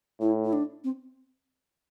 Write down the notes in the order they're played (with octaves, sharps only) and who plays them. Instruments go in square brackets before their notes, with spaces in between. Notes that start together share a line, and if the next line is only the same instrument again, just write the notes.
[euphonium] A2 [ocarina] E4
[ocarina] E4
D4
C4